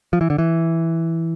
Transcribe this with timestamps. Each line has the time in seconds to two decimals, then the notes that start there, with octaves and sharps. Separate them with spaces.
0.13 F3
0.21 E3
0.30 D3
0.38 E3